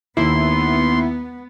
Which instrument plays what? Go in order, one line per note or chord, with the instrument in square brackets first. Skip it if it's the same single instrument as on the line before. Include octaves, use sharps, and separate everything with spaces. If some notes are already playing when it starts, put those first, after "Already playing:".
[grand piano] D#2 [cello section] B3 [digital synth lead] E4 [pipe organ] C6